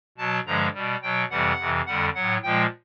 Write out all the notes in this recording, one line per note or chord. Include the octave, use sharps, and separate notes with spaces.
B2 F#3 A5
G2 D3 F3 G#3 A#5
B2 G3
B2 F#3 G5
F2 C3 E3 G3 F#5
F2 C3 E3
F2 D3 G3 F#5
A2 F#3 F#5
A#2 F3 G#3 G5